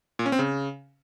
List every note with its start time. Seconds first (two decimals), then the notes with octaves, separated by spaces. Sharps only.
0.19 A#2
0.26 C#4
0.32 C4
0.39 C#3